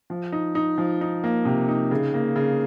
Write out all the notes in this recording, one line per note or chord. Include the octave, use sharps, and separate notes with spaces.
F3
D#4
D#4
F3
D#4
A#3
C3
D#4
C#3
A#3
C#3